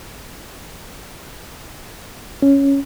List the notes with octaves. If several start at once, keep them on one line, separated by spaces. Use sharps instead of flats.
C#4